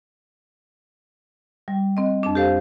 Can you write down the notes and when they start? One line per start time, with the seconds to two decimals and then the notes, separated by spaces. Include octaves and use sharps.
1.68 G3
1.97 C4 D#5
2.23 F2 D4
2.35 G4 A4 C5 F5